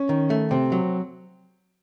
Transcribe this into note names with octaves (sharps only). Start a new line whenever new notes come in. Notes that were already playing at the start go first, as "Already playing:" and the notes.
Already playing: C#4
D#3
A3
C3 C4
F#3